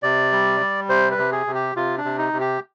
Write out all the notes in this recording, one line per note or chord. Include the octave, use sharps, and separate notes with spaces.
C3 D5
G3
G3
C3 C5
B4
C3
G#4
C3
G4
C3 F4
D4
C3
D#4
C3
G4